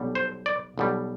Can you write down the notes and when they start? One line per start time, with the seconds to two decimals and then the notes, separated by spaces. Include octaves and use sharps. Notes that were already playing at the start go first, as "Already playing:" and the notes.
Already playing: B1 B2 G3
0.15 C5
0.46 D5
0.78 B1 B2 G3